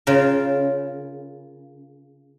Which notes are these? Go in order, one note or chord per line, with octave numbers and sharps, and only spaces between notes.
C#3 F4 A#4